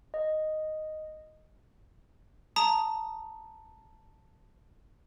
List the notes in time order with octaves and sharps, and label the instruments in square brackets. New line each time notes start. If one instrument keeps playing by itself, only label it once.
[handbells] D#5
[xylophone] A5 A#5 D#6